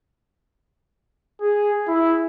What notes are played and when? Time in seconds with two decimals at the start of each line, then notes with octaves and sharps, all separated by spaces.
1.41 G#4
1.88 E4